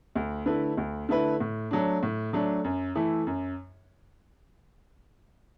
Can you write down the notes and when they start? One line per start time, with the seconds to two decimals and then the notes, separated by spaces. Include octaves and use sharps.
0.16 D2
0.46 D3 A3 E4 B4
0.77 D2
1.09 D3 A3 E4 B4
1.40 A2
1.71 F#3 A3 D4
2.03 A2
2.33 F#3 A3 D4
2.64 F#2
2.95 E3 A3 E4
3.27 F#2